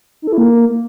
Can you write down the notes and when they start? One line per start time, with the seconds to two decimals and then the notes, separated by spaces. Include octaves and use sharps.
0.22 D#4
0.27 A4
0.33 E4
0.38 A#3